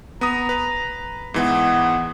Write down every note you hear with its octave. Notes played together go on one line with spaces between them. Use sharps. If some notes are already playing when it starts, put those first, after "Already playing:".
B3 A#5 D#6
B4
G#2 E3 B3